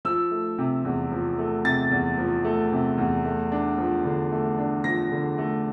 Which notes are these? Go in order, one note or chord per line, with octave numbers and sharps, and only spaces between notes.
F3 E6
A3
C3
E2
F3
A3
C3 A6
E2
F3
A3
C3
E2
A3
D4
F3
D3
A3
D4
F3 A#6
D3
A3